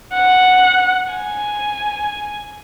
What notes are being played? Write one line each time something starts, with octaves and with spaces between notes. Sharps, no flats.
F#5
G#5